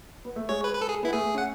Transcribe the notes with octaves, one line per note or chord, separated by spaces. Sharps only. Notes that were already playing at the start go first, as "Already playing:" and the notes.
B3
A3
G#3 C#5
B4
B4
A4
G#4
B3 E4
A3 G#4
C#4 F#5